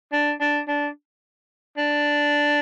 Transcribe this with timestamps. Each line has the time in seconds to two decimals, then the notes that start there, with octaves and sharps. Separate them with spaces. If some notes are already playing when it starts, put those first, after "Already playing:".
0.13 D4
0.41 D4
0.68 D4
1.78 D4